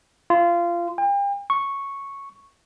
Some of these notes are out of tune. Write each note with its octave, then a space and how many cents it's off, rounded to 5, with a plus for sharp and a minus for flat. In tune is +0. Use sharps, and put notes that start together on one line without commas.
F4 -20
G5 +40
C#6 -5